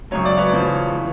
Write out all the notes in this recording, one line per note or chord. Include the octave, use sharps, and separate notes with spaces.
G#1 F#2 C#3 F#3 C#5
D5
B4 C#5
E2 C#3 F3
E3